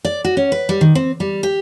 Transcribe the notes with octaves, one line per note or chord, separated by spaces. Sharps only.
D5
F#4
C#4
B4
G3
D#3
C4
G3
G4